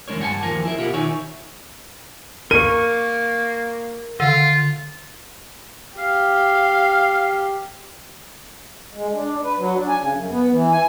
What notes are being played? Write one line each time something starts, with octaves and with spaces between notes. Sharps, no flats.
E2 E3 G#3 D4 A#4 C#5
G2 F#5 G#5 A5
D#2 F3 F4 A#4 G#5
E4 G#4 A#4 E5
B2 F4 G4 A#4 F#5
D#3 D#4 C#5 E5 G#5
A#3 A#4 C#6 D#7
D3 F4
G4 F5
G#3
D4
B4
F#3
D4
G#5
C#3
F#2
B3
E3
G#5